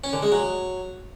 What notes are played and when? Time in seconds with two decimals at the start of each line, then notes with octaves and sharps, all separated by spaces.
0.04 C#4
0.13 D3
0.23 G#3
0.32 F#3